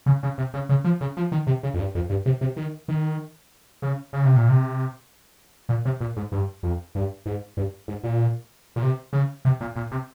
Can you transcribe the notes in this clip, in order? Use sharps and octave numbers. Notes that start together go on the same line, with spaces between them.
C#3
C#3
C3
C#3
C#3
F3
C#3
F3
D#3
C3
C#3
F2
G2
F2
G2
C3
C3
D#3
D#3
C#3
C#3
C3
A#2
C3
A#2
C3
A#2
G#2
G2
F2
G2
G#2
G2
G#2
A#2
A#2
C3
C#3
C3
A#2
A#2
C3